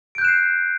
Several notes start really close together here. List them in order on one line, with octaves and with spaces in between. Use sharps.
D7 G6 F#6 E7 C7